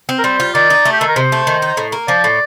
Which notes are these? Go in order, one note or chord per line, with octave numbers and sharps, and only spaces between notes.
C4
A#4
G3 C5
F4
D#3 D5
D#4
A3
G4
D#3 A4
A#4
C3 C5
A3
D#3
D#4
A2
A#3
F3 D5
A2